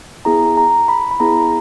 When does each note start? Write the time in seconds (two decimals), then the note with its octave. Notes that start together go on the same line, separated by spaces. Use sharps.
0.25 B3 E4 G#4 A#5
0.57 A#5
0.88 B5
1.11 B5
1.20 B3 E4 G#4 A#5